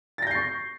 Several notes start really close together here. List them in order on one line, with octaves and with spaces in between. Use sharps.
A6 A#6 G6 C7 C#6